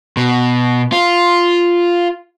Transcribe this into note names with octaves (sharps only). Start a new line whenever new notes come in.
B2
F4